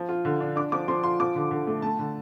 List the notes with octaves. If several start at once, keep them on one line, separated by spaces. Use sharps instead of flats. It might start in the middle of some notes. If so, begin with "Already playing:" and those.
Already playing: F3
F4
D3
D4
D4 D6
F3 D6
F3 C6
F4 C6
F3 D6
D3
D3
A3
A3 A5
D3